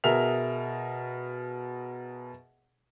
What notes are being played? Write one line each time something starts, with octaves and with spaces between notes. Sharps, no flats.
B2 G#4 A#4 E5 F7